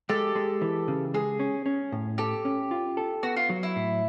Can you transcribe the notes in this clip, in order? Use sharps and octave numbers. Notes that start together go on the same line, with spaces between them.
G#3 G4 A4
G#3
E3
C#3
G#3 G#4
C#4
C#4
A2
G4 A4
C#4
F4
A4
B3 F#4
F4
F#3
E4
A2